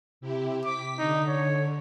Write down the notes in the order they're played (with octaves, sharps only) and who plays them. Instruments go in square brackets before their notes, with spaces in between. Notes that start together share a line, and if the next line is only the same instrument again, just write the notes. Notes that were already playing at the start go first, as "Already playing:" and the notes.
[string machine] C3 E4 G4
[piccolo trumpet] D6 [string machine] B6
[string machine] D3 [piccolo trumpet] D#4
[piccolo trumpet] C#5